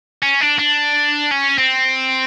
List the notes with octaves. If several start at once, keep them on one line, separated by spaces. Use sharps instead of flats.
C#4
D4
D4
C#4
C4